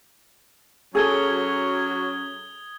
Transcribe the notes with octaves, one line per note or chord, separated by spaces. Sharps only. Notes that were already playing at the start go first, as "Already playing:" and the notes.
F#3 C#4 G#4 A4 D#6 G#6 G7